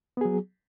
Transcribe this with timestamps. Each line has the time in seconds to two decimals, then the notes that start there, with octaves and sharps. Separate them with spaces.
0.17 B3
0.21 G#4
0.25 F#3